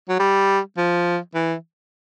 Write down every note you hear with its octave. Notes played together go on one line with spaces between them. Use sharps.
F#3
G3
F3
E3